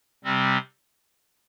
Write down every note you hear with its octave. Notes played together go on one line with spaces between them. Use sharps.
C3 G3 C4